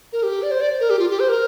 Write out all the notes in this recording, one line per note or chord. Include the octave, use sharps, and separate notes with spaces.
A#4
G4
D5
C5
D5
A#4
G4
F4
G4
C5
A#4